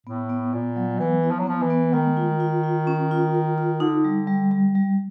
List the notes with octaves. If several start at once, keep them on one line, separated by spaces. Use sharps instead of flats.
A2 B3
B3
A#2 B3
F#3
E3 B3
E4
F3
F#3
F3 B3
E3
B3
D#3 G#3
F4
F4
F4
C#4
F4
A#4
F4
D3 D#4
G3
G3
G3
G3